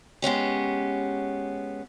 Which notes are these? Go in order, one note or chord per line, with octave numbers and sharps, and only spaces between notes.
G#3 B3 C#4 G4